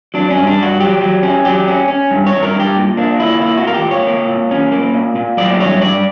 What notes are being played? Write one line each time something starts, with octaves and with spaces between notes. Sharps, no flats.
F#3 D4
C#4
G2
D4
G2
F#4
F#3 G4
F#3
C#4
F#3 G4
C#4
C#4
G2
C#5
G2
A#4
G2
G4
A#2
A#3 D4
A#2 E4
A#3 E4
F#4
A#2 A#4
G4
A#2
C#5
A#3
A#2
C#4
A#3
A#2
A#2
F#3 D5
G2 C#5
G2 D5